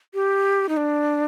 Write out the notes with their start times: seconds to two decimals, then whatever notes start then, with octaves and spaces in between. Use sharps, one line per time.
0.14 G4
0.69 D#4
0.77 D4